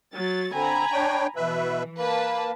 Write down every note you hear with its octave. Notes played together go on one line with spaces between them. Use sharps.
F#3 A6
D3 C4 G#5 A#5 B5
D4 C#5 G5
B2 E3 B4 E5
A#3 B4 A5